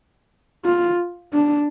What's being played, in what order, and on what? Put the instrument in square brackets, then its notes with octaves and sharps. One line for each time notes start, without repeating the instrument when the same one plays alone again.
[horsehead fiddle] F4
D4